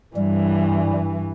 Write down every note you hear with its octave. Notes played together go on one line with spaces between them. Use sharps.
G2 E3 G3